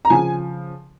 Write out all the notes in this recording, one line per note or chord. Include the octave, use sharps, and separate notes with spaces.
A#5
C#3 F3 G#5